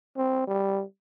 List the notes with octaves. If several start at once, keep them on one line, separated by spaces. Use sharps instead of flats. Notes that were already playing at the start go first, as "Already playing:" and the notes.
C4
G3